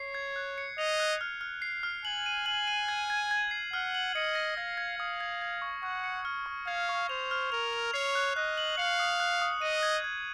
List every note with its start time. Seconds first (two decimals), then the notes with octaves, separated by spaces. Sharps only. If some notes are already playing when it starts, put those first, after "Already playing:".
Already playing: C#5 C7
0.14 G#6
0.36 F#6
0.58 C#7
0.78 D#5 F7
1.00 F#6
1.21 F6
1.41 F6
1.62 C7
1.83 F6
2.05 G#5 F#7
2.26 D#7
2.46 G#5 F#7
2.68 D#7
2.88 G#6
3.10 G#6
3.31 G#6
3.51 C7
3.73 F#5 F6
3.94 F#7
4.15 D#5 C#7
4.35 A#6
4.57 F5 G#6
4.77 G#6
4.99 F5 D#6
5.20 G#6
5.42 G#6
5.62 C#6
5.83 F#5 C#6
6.04 C#7
6.25 F6
6.46 C#6
6.67 F5 G#6
6.89 C#6
7.09 C5 F7
7.31 F6
7.52 A#4 F7
7.73 F7
7.94 C#5 C7
8.15 F#6
8.36 D#5 F#6
8.57 F#7
8.77 F5 C#7
9.00 D#6
9.20 F#6
9.42 D#6
9.62 D#5 D#7
9.83 G#6
10.04 G#6